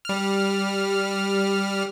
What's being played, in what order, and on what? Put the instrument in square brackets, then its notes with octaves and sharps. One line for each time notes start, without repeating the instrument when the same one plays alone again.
[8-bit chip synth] G3 F6